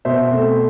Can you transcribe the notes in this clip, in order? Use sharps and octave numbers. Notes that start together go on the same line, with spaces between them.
B2 C5 E5
A3 C4